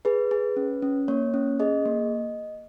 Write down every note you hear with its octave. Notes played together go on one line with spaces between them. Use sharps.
G#4 B4
G#4
C#4
C#4
A#3 C#5
C#4
G#4 D#5
A#3